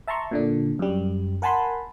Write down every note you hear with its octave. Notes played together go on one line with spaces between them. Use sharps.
E5 A5 A#5 C6 C#6
A#2 D3 D4
F#2 G3
A#4 F#5 G#5 A5 B5 C6